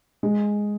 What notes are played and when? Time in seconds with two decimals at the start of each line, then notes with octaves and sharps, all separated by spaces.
0.23 G#3